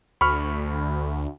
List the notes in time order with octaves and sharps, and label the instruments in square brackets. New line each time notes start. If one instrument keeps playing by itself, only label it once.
[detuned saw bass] D2 [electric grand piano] B5 C#6 F6